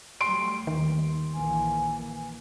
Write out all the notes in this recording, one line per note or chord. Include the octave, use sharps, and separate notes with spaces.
F#3 G3 A3 C6 D7
D#2 D#3
A#1 E3 A#3 G#5